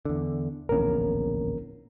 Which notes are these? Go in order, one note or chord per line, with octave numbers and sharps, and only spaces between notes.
E2 D3
D1 A#1 E2 C#4 A#4